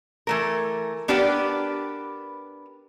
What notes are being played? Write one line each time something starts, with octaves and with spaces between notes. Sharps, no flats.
E3 A3 A#4
B3 D4 G4 A#4 B4